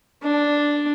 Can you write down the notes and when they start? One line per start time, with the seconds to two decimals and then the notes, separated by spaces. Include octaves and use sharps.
0.23 D4